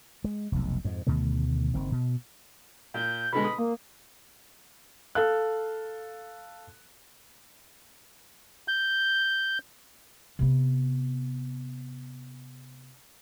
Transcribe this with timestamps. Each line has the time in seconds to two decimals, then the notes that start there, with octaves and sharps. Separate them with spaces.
0.24 G#3
0.52 F1 B1
0.85 F2 G#2
1.07 D2 B2 D#3 A3
1.74 F#1 D#3 C4
1.92 B2
2.94 A#2 G6
3.33 B2 D3 G#3 B5
3.44 D#6
3.59 A#3
5.15 A4 F5 F#6
8.68 G6
10.39 C3 B3